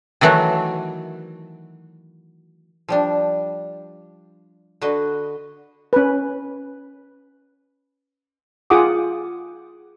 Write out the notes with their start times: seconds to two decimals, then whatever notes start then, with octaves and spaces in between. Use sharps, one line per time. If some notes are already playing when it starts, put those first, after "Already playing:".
0.21 D#3 E3 F#3 A3 F#4
2.89 F3 G3 D4
4.81 D3 F#4 B4 D#5
5.93 C#4 B4
8.70 F4 G#4 F#5 G5 D6 D#6